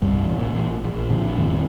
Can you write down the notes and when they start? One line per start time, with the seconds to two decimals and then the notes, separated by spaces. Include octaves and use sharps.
0.02 C2 G2
0.24 A1
0.38 A1 A#2
0.84 A#1
1.10 A#2 D3 F3
1.37 D#1 G#1 F2 A2